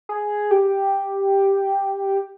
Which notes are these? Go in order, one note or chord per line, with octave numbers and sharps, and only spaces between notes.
G#4
G4